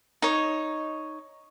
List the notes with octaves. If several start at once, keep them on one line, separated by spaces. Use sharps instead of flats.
D#4 C#5